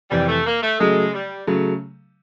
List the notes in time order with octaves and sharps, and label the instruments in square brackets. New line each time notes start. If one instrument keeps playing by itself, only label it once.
[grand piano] F2 C3 E3 [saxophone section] G3
[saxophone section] A3
A#3
A3
[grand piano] C#3 F#3 A3 [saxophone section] G#3
[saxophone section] G3
[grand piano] C#3 F#3 A3